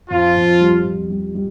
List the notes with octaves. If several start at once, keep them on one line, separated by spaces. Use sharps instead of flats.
F2 F3 F4
F2
G3
F2
G3
G3